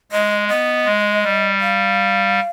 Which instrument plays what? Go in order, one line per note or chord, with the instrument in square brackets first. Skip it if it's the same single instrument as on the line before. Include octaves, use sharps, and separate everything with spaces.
[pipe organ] G#3 [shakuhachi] D#5
[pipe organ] B3 [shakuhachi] D#5
[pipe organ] G#3
G3
[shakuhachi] F5